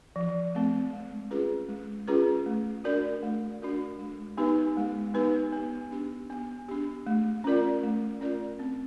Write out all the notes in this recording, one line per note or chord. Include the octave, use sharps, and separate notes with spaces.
F3
A3 C4
G#3
C#4 F4 G#4 B4
G#3
C#4 F4 G#4 B4
A3
D4 F#4 A#4 D5
A3
D4 F#4 A#4 D5
G#3
B3 D#4 G4 B4
G#3
B3 D#4 G4 B4
B3
D4 G4
B3
D4 G4
A3
C#4 F4 A#4 D5
A3
C#4 F4 A#4 D5
C4